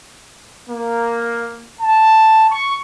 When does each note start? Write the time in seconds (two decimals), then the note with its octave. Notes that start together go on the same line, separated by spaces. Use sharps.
0.69 A#3
1.81 A5
2.51 C#6